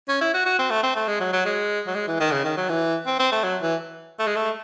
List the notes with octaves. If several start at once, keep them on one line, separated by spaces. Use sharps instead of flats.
C#4
E4
F#4
F#4
C4
A3
C4
A3
G#3
F#3
F#3
G#3
F#3
G#3
E3
D#3
C#3
D#3
F#3
E3
C4
C4
A3
F#3
E3
A3
G#3
A3